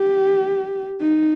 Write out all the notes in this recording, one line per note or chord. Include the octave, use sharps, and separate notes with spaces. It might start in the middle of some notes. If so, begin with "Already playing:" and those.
Already playing: G4
D#4